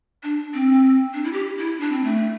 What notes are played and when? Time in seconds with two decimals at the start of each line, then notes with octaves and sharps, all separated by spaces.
0.23 D4
0.54 C4
1.14 D4
1.24 E4
1.33 G4
1.59 E4
1.80 D4
1.92 C4
2.04 A3